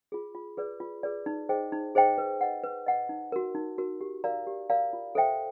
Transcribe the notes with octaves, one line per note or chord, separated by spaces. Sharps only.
F4 G#4
F4
G#4 B4 D5
F4
G#4 B4 D5
D#4
G#4 C5 D#5 G5
D#4
G#4 C5 D#5 G5
B4
D#5 F#5
B4
D#5 F#5
D#4
F#4 A#4
D#4
F#4 A#4
G4
A#4 D5 F5 A#5
G4
A#4 D5 F5 A#5
F4
A4 C5 E5 G5